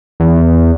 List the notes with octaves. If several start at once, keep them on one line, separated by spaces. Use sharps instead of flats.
E2